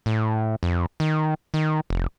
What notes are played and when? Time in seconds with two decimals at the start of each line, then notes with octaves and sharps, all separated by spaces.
0.06 A2
0.63 F2
1.00 D#3
1.54 D#3
1.90 F1